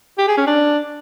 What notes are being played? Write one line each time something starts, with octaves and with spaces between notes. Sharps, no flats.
G4
G#4
C#4
D4